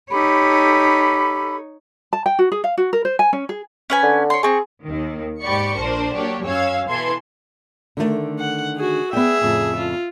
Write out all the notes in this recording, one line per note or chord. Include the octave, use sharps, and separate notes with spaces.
D#4 G4 A4 C#5 B5
A5
G5
F#4
G#4
F5
F#4
A#4
C5
G#5
C#4
G#4
C#4 B4 G#5
D3
C#5 C6
C4 G#4 C#6
D#2 D#3
G#2 G4 D5 B5 C#6 C#7
A#1 D4 A#4 C5
F#3 A#3 D4 G4 C#5
F#2 C#4 C#5 F5 E6 G#6
B2 E3 A4 C6 G#6
D3 D#3 A3
F#5
F#4 G#4
B3 G#4 D5 E5 G5
F2 A2 C#3
F4